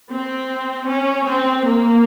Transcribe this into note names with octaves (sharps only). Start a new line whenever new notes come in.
C4
C#4
C4
A#3